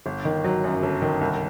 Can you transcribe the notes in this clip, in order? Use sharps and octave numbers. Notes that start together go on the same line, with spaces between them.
G1
D#3
F#3
F#2
G1
D#3
C2